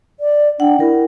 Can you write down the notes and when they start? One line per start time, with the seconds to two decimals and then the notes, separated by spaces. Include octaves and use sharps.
0.20 D5
0.60 D4 F#5 G5
0.80 E4 A#4